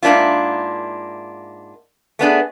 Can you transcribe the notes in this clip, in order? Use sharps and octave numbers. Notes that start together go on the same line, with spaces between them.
G#2 A#3 D4 E4 F4
A3 B3 D4 G#4